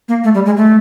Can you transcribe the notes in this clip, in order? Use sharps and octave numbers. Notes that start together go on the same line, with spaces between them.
A#3
A3
G3
G#3
A3